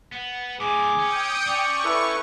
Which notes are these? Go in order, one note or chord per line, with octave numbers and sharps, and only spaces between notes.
B3
A2 D3 G#4 D6
C#4 G5 D#6 C#7
C#4 C#5 D5 C#6
E4 A4 B4